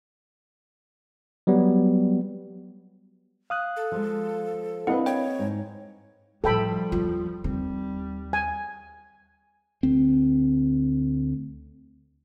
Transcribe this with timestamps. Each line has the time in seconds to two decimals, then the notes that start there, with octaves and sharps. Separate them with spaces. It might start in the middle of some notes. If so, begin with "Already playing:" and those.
1.47 F#3 G3 B3
3.50 F5 D#6 F#6
3.76 A4
3.92 F3 G#3
4.87 A#3 C4 D4 E4 B4 D#5 F#5
5.06 C#5 G5
5.39 G#2
6.44 A2 F3 G3 A3 A4 G5 B5
6.92 E2 F4
7.44 D#2 G3 C4
8.33 G#5
9.83 D2 C4